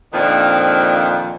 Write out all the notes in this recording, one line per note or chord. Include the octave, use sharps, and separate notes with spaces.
F2 A#2 D#3 F3 C4 D4